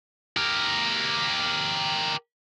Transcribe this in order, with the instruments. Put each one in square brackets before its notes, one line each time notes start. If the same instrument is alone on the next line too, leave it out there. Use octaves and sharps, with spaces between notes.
[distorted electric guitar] G4 A#4